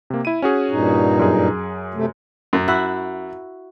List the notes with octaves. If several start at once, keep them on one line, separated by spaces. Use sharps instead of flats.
C3 A#3
E4 D#7
C#4 F#4 G#4
G2 A#2 D#4
F#2 G#4
C3 A3
F#2
E4 F#4 E5